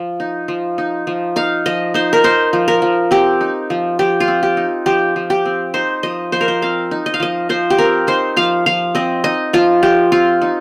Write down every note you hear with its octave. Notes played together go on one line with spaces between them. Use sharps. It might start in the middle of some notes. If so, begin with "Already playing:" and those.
Already playing: F3
D#4
F3
D#4
F3
D#4 F5
F3 D#5
D#4 C5
A#4
D#4 C5
F3
A#4
F3
C4 G4
D#4
F3
F3 G4
F4
C4
G4
D#4
F3 G4
F3
G4
C4
D#4 C5
F3 D#5
F3 C5
A#4
C5
C4 F5
D#4
D#5
F5
F3 D#5
F3 C5
G4
C4 A#4
D#4 C5
F3 F5
F3 F5
C4 D#5
D#4 D#5
F3 F4
F3 G4
C4 F4
D#4